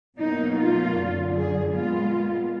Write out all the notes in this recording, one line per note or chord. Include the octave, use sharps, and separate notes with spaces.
B2 F#3 A#3 D#4
F4
F#2 D3 F#3
G#4
A#2 G#3 B3 F4